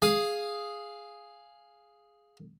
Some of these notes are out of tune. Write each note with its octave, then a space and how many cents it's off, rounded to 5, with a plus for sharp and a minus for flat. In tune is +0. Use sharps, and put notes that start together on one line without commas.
G#4 +0 F5 +0 D#6 +0